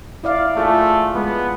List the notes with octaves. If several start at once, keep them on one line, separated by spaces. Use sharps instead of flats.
E4 D5 F5
A3 F4 G#4
G#3 B3